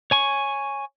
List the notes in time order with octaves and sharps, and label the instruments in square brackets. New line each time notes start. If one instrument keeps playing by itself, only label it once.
[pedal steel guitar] C#5 G#5 C#6